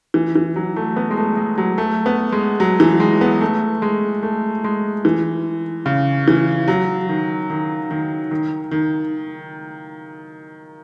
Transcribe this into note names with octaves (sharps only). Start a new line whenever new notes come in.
E3
E3
F#3
A3
B3
G#3
A3
G#3
F#3
A3
B3
G#3
F#3
E3
G#3
B3
A3
G#3
A3
G#3
E3
C#3
E3
F#3
D#3
D#3
D#3
D#3
D#3